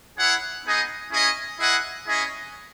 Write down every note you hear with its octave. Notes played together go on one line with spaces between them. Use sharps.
E4 G#4 C#5 F#5
B3 D#4 G#4 D#5
C#4 E4 G#4 D#5
E4 G#4 D#5 F#5
C#4 E4 G#4 D#5